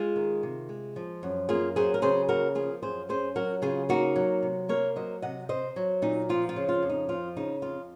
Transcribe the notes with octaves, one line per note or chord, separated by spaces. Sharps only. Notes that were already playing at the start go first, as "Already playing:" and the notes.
Already playing: G#3 F4 G#4
D#3
C3
G#3
F3
F#2
A#3 F4 G#4
F#3 G#4 C5
A#4
C#3 G#4 C5
A#3 F#4 A#4
F3 F4 G#4
F#2 G#4 C5
C#4 G#4 C5
F#3 F#4 A#4
C#3 F4 G#4
A#3 D#4 F#4
F#3
C3
A#3 A#4 C#5
F#3 C5 D#5
C3 D#5 F#5
C4 C5 D#5
F#3
A#2 D#4
F3 F4
F4
C#3
F4
F2
D#4
F3 F4
C#3 D#4
F2 F4